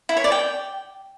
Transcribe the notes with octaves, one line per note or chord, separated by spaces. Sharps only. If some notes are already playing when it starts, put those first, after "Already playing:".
E4
C#5
D5
G5